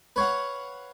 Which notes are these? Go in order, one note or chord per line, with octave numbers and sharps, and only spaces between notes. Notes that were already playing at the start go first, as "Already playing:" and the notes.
B4 C#5 F5 F#5